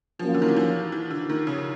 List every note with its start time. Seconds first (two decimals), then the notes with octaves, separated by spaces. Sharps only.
0.19 F3 F#3 A#3 C#4 F4
0.34 D3
0.42 D#3
0.48 E3
0.56 F3
0.92 E3
1.10 D3
1.30 D#3
1.47 C#3